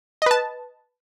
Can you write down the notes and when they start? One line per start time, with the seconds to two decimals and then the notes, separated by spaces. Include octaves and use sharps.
0.22 D#5
0.26 B4
0.31 A5